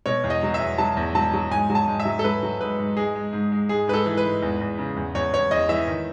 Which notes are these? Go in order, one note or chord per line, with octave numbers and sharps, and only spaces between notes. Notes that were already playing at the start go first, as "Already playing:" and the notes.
B2 C#5
E2
D#5
F#3
E5
E2
F#3 A5
E2
F#3 A5
F#3
G#2 G#5
F#3
A5
G#2
E5
F#3
A4
F#3 B4
F#3
G#2 B4
G#2
G#3 G#4
G#3
G#2
G#3
G#2 G#4
G#2 B4
A4
E3
B4
G#2
E2
E2
C#3
E2
E2 C#5
E2 C#5
E2 D#5
E3 E5
D#3